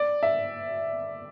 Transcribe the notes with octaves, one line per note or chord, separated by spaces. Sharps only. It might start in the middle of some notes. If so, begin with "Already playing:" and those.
Already playing: D5
E5